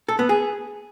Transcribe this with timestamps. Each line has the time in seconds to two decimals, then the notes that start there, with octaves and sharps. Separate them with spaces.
0.08 A4
0.19 B3
0.29 G#4